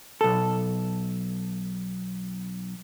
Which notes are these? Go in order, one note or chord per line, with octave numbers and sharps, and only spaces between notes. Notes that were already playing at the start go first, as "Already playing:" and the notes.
B1 A4